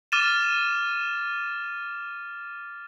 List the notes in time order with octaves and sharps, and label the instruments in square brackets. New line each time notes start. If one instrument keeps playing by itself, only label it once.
[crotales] D6 F6 A6 D#7 E7